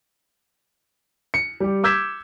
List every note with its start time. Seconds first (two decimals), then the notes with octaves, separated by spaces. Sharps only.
1.34 C#7
1.60 G3 G4
1.84 D6 E6 G6 G#6 B6 E7